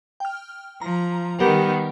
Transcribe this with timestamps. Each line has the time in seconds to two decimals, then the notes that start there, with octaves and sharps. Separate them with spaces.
0.20 G5 F6
0.81 F3 A#5
1.40 D#3 G3 B3 G4 A#4